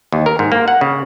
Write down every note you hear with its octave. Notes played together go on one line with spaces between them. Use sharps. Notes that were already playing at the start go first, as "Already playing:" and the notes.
D#2
A#4
G#2
A#3
F#5
C#3